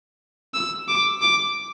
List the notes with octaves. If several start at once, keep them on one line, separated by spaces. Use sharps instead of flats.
E6
D6
D6